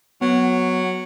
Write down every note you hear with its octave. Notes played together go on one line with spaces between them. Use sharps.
F#3 B3